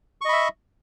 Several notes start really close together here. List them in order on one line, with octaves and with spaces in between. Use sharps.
C#6 D#5 B5 E5